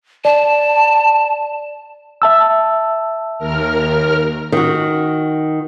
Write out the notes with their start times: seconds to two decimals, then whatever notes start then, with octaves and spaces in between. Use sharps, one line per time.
0.25 D5 A5
2.22 E5 A5 E6
3.38 D#2 A#4 F6
4.52 D#3 F#4